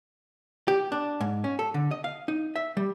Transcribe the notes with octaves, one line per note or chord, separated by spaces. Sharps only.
G4
D4
G#2
C#4
A4
D3
D#5
F5
D#4
E5
G3